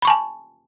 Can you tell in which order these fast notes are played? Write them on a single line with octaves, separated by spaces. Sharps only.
B5 C#6 A5 G#5